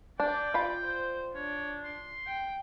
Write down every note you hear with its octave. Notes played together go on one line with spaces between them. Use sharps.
D4 D5 G5
F4 B5
C5
D4 C#5
C6
G5